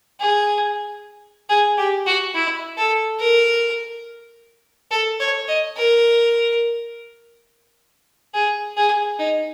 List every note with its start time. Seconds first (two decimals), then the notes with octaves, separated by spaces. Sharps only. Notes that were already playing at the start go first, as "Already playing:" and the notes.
0.20 G#4
1.49 G#4
1.78 G4
2.07 F#4
2.35 E4
2.77 A4
3.20 A#4
4.91 A4
5.20 C#5
5.48 D#5
5.77 A#4
8.34 G#4
8.77 G#4
9.19 D#4